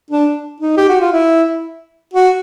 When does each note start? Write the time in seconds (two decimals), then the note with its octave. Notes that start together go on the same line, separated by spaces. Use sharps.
0.10 D4
0.60 D#4
0.77 G4
0.89 F#4
1.01 F4
1.12 E4
2.14 F#4